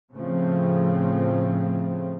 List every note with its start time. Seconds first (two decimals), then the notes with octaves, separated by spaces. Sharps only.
0.14 A2 C#3 F3 A3 C4